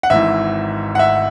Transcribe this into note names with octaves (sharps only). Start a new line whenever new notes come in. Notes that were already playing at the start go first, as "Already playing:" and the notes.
F#5
G#1 G#2 E3 E5
F#5
E5